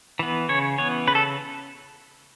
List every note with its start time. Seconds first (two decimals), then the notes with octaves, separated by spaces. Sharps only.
0.19 E3 B3
0.49 C#3 C#5
0.78 E3 B3 C#5
1.07 C#3 B4
1.15 A4